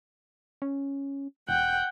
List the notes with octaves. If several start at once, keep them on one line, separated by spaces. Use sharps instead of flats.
C#4
E1 F#5 G5 G6